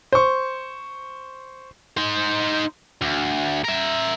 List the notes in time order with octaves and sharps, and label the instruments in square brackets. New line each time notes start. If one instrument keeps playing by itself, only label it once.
[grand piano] C5 C#6
[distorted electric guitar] D#4 C5
D2
A#4 E5